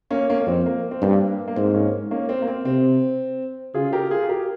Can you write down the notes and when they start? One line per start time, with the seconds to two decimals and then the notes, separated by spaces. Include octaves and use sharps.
0.11 A#3 C#4
0.30 A#3 C#4
0.40 A#3
0.47 F2 C4
0.66 A#3
0.91 C4
1.02 G2 A#3
1.48 A#3
1.56 G#2 C4
1.74 A#3 C#4
2.11 A#3 C#4
2.29 C4
2.42 A#3
2.48 C4
2.65 C3 C4
3.74 C#3 F4 G#4
3.92 G4 A#4
4.11 F4 G#4
4.29 G4 A#4